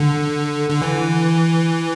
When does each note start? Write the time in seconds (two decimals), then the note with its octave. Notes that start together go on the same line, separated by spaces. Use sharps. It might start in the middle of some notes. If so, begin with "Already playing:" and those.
Already playing: D3
0.70 D3
0.82 E3